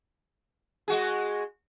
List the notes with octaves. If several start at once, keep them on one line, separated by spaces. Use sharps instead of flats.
G#3 F#4 G#4